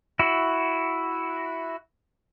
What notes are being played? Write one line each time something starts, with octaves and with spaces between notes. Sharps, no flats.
E4 F#4